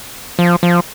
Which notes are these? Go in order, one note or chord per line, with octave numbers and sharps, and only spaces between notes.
F3
F3